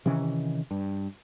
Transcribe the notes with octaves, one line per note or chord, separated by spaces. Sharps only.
C3 D#3 E3 C#4
G2